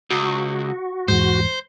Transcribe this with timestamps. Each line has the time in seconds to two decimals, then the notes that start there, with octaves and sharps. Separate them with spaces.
0.10 C#2 F#4
1.08 E2 G#2 C5